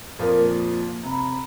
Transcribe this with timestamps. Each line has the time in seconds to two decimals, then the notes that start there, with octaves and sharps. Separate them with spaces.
0.19 F2 A#2 F3 A4 A#4
0.39 A#3
1.03 C3 A#5 B5